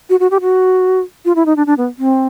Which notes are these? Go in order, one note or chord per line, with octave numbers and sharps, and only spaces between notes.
F#4
F#4
G4
F#4
F4
E4
D#4
D4
D4
B3
C4